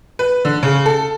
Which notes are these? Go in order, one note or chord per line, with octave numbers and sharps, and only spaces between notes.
B4
D3
C#3
A4